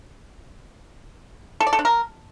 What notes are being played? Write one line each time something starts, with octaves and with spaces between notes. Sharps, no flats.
A4
D5
A4
D4
A#4